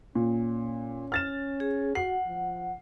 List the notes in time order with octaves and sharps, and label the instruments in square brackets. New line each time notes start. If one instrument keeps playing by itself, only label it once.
[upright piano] A#2 [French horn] C#4
[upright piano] F6 A6 E7
[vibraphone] G#4
[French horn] F#4 [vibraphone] F#5 [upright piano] C7
[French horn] F3